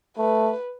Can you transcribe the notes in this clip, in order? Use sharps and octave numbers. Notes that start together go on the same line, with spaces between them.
A3 B4